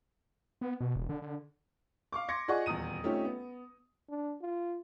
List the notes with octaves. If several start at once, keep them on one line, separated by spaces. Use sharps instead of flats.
B3
B2
E1
D3
D3
F5 C#6 D6
C6 D6 G#6 A#6 C#7
F4 G#4 D5 D#5 F#5 C#6
D#1 E2 D#6 D#7
A3 C4 C#4 D#4 F4 G4
B3
D4
F4